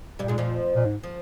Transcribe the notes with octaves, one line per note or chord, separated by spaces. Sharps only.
G2 A#2 G3
G#2 G#3
F2 F3
A#2
G#2
F3